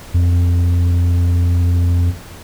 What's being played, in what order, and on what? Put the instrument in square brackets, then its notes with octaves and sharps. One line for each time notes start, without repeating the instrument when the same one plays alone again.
[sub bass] F2